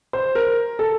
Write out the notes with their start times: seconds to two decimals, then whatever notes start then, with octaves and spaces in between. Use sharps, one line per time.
0.13 C5
0.35 A#4
0.79 A4